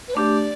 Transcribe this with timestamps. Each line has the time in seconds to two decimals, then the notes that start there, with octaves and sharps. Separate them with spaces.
0.08 B4
0.14 A3 D4 G4 D5